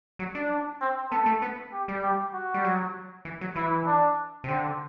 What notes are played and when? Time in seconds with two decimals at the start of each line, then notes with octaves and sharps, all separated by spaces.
0.19 F#3
0.35 D4
0.81 C4
1.11 B3 A4
1.26 A3
1.42 B3
1.72 G4
1.88 G3
2.03 G4
2.33 F#4
2.54 G3
2.64 F#3
3.25 E3
3.41 F#3
3.56 E3 E4
3.87 D4
4.44 C3
4.48 D3 C4